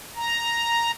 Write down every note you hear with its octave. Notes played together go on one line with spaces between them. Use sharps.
A#5